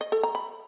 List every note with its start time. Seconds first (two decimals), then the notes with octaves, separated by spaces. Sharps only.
0.01 D#5
0.12 A4
0.23 A#5
0.35 B5